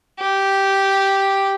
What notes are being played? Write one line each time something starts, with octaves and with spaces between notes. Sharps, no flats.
G4